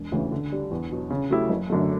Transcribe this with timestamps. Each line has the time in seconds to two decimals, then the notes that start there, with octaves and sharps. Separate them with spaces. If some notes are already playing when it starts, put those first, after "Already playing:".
Already playing: E1
0.12 D2 C#3 E3
0.32 D3
0.52 G3 D4
0.71 E2
0.91 B2 F#3
1.11 C#3
1.30 F#3 A3 E4 G4
1.49 F#1
1.70 F#2 D3 A3